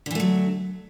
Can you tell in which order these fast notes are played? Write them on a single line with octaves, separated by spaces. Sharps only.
D3 E3 A3 F#3